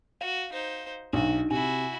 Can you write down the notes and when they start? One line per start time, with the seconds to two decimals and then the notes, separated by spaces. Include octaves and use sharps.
0.21 F#4 F5
0.52 D#4 C5
1.13 B1 D4 D#4 F#4
1.51 C3 E4 F#4 G#5